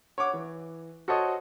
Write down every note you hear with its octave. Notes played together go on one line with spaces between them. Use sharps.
C#5 F#5 D6
E3
F#4 A4 C5 C#5 D#5